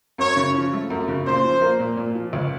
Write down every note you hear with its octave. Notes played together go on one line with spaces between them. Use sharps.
F#2 C#5
C#3
F3
A3
F#2
C#3
A#2 C5
F3
A#3
A#2
A#2
F3
C#2